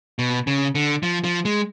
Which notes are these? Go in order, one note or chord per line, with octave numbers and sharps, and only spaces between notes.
B2
C#3
D3
F3
F3
G#3